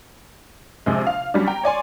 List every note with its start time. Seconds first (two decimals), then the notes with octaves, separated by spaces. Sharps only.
0.86 A#1 C3 G#3
1.06 F5
1.34 F#3 G3 C#4 D4
1.47 G5 A#5
1.63 C#5 D5 G#5 C6